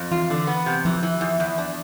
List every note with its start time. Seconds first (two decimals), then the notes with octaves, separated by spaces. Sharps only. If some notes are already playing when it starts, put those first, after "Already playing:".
Already playing: F2
0.11 E3 F4
0.30 D3
0.47 B3
0.66 C3
0.85 E3 F3
1.03 E3
1.21 E2
1.40 E2
1.58 D4